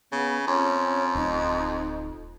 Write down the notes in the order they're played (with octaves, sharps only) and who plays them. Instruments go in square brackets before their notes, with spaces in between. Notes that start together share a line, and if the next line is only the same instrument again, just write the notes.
[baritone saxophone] C#3 [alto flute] B3
[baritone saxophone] F2 [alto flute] C#4
[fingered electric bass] D1 [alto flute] D#4